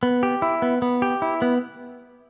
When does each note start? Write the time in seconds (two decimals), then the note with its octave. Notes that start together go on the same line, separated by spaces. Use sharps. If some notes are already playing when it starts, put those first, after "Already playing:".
0.03 B3
0.23 G4
0.42 E4
0.62 B3
0.82 B3
1.02 G4
1.22 E4
1.42 B3